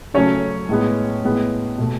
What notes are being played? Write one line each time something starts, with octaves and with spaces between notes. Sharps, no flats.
C#3 F#3 A3 C#4 C#5
A2 G#3 B3
A2 G#3 B3
B2 A3